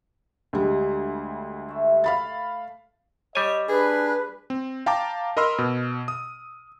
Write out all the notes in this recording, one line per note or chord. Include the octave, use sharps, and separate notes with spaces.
D2 G3 G#3
A3 E5
F5 B5 A6
G3 C#5 D#5 G#5
D4 G#4 B4
C4
F5 G5 A5 A#5 D6
A#4 D#5 B5 C6 E6 F6
B2
D#6